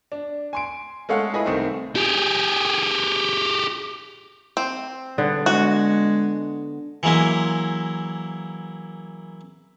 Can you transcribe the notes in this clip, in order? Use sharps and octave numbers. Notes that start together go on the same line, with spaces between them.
D4
G#5 C6 D7
G#3 A3 A4 C#5 F5 F#5
E4 G#4 B4 D#5 B5
C2 D#3 A3 C4
G4 G#4
C4
D3 G3 B3
G#3 F#4
E3 F#3 G#3 A#3 E4